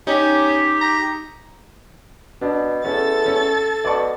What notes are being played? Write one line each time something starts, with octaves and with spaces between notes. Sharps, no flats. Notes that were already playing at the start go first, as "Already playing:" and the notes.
C#4 D#4 G4
A#5
B2 D4
E2 C#4 A4 A6
C#4
B2 D5 A5 C#6